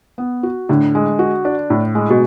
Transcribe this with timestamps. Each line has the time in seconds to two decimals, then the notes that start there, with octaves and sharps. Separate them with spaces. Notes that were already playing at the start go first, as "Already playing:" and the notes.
0.18 B3
0.43 F#4
0.69 A2 D3
0.95 G#3
1.19 F#4
1.45 D4
1.70 A2
1.95 G#3
2.10 B2